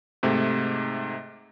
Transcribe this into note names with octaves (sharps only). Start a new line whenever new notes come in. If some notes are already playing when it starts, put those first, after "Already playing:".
G#2 C3 A3